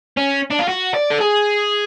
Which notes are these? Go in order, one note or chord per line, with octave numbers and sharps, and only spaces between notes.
C#4
D4
F4
F#4
D5
A4
G#4